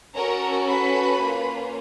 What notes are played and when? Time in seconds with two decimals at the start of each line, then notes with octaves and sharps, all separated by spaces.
0.14 C#4 F#4 A4 A#4 A#5
0.68 B4 B5
1.21 A#3 C#4 F4